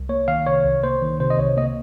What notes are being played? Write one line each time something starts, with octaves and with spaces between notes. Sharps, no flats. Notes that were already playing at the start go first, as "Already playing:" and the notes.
Already playing: C2
A#3 C#5
D#3 F5
C3 C#5
C2
A#3 C5
D#3
C3 C5
D#5
C2 C#5
A#3 D#5